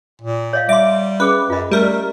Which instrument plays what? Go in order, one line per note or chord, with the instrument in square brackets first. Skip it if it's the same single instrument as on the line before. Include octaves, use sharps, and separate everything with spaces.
[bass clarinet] A#2
[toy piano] C#5 D#5 F5
[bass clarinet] G3 [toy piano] E5 C6 [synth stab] D6
[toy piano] C#4 G#4 D6 [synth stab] B4
[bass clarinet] F#2 [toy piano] F4 D#5
[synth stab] G3 A#4 [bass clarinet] A3